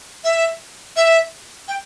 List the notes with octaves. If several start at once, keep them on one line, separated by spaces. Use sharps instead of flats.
E5
E5
G5